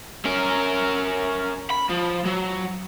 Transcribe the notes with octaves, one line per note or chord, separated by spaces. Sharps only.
C#4 A#4
B5
F3
F#3